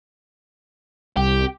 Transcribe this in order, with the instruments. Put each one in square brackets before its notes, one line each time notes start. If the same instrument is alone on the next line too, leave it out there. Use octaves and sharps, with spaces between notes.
[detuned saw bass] C2 [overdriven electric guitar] G4